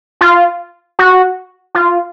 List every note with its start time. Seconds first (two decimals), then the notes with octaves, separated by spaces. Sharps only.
0.21 F4
0.99 F#4
1.75 F4